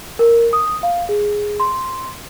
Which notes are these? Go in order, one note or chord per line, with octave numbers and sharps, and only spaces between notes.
A#4
D#6
F5
G#4
C6